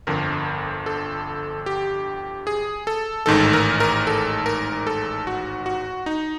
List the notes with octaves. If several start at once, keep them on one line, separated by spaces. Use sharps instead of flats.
G1 F2 D3 A#4
A4
G4
G#4
A4
A1 G#2 D#3 A4
A#4
A#4
A4
A#4
A4
F#4
F#4
D#4